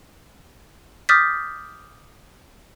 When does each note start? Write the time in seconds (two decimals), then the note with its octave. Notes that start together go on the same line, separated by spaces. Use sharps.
1.09 D6 D#6 F6 G6 A6 B6